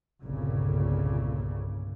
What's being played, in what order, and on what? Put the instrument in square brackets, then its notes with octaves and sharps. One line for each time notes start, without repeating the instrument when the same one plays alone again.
[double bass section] G1 C2 A#2 C#3